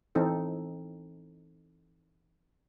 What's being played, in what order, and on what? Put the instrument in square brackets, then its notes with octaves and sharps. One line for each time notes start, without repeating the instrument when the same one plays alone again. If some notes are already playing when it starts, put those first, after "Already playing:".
[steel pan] E3 C4 D#4 A4